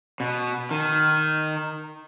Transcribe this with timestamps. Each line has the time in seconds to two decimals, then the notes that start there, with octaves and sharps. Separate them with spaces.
0.20 B2
0.71 D#3